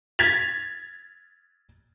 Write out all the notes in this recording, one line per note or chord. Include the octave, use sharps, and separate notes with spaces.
G#6 A6 B6 F7